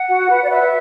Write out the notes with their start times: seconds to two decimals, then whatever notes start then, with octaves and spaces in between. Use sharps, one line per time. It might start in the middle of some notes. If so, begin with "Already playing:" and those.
Already playing: F#5
0.09 F#4
0.29 B4
0.43 D5
0.49 B4 E5